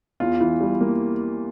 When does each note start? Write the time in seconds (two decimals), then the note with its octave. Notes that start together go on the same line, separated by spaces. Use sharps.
0.20 E2 F4
0.41 E3
0.61 G3
0.81 A#3